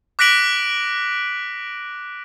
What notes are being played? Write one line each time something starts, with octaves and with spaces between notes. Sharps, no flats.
D6 F#6 A#6 B6 D7 F#7